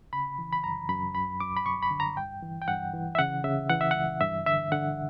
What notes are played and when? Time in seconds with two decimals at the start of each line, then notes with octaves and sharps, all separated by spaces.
0.13 C#3 B5
0.39 E3
0.53 B5
0.64 F#2 A#5
0.89 F#2 B5
1.14 F#2 B5
1.40 F#2 D6
1.56 B5
1.66 F#2 C#6
1.82 B5
1.91 D3
2.00 A#5
2.17 G2 G5
2.42 E3
2.62 G5
2.68 G2 F#5
2.93 E3
3.15 E5
3.19 C#3 F#5
3.44 C#3 E5
3.70 E3 F#5
3.81 E5
3.91 C#2 F#5
4.21 G2 E5
4.46 D3 E5
4.72 D3 F#5